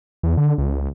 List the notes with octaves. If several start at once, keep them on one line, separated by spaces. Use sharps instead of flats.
E2
D3
C#2